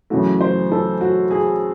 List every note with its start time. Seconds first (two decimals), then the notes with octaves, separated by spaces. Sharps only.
0.10 F#2 C#3 E3 A3 F#4
0.41 C5
0.72 A4
1.01 F#4
1.31 G#4